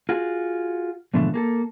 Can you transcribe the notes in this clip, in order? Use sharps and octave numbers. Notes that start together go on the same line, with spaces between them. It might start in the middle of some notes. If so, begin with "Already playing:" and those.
F4 F#4 G#4
G#2 B2 D3 E3 F3 A3
A#3 G#4 A4